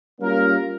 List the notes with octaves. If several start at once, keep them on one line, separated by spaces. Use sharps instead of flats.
G3 A#3 C#4 F4 A#4